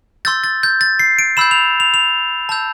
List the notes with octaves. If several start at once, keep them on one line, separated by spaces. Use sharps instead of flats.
C6 E6 G6 A6
A6
G6
A6
C7
D7
B5 E6 G6 E7
F7
F7
F7
A5 E6 G6